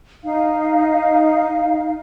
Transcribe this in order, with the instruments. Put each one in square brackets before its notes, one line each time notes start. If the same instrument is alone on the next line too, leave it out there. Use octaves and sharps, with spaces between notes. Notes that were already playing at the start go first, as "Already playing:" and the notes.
[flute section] D#4 F5